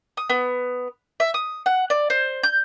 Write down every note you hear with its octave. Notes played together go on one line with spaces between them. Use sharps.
D#6
B3
E5
D#6
F#5
D5
C5
G6